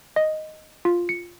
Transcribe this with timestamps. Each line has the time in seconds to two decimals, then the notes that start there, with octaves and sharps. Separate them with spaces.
0.16 D#5
0.85 F4
1.09 C#7